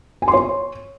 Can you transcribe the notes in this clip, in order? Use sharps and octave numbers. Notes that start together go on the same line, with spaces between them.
G#5
C6
C#5